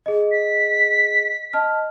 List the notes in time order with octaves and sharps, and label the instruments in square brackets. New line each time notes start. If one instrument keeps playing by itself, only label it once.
[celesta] G#4 D#5
[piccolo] B6
[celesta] D#5 A5 F6